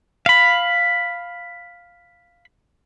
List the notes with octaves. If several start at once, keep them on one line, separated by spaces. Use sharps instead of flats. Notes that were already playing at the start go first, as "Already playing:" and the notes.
F5 B5